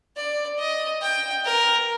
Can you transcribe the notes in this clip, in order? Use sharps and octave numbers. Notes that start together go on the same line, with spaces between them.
D5
D#5
G5
A#4